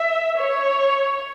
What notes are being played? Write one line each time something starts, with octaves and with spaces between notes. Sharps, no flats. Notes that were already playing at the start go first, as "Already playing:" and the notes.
Already playing: E5
C#5